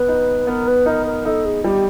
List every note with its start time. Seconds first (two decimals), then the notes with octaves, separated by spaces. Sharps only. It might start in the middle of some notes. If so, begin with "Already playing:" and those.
Already playing: B3 B4
0.08 D#4
0.47 B3 A#4
0.67 B4
0.86 D#4 A#4
1.06 A#4
1.25 D#4 A4
1.45 G#4
1.64 G3 G4